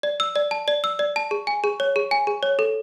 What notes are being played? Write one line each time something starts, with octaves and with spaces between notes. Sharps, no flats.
D5
E6
D5
A5
D5
E6
D5
A5
G#4
G#5
G#4
C#5
G#4
G#5
G#4
C#5
A4